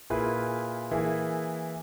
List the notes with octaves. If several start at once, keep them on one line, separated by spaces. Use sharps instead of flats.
A#2 A#3 E4 G#4 B4
E3 A#3 E4 G#4